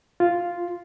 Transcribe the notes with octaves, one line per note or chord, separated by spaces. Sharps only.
F4